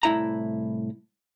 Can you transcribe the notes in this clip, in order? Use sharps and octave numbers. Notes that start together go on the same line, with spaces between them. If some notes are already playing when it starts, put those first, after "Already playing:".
C2 A2 E4 E5 A#5